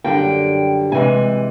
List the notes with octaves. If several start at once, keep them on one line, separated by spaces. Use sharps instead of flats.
F#2 D3 G3 G5
C3 E3 G#3 G#5